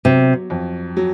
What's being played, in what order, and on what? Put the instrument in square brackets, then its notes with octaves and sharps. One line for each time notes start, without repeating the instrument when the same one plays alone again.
[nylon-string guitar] C3 [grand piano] F#3
[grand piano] F2
F#3